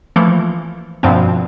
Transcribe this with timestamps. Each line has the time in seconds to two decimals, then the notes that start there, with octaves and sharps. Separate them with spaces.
0.16 E3 F3 A3 A#3
1.03 G2 B2 F3 A#3 C4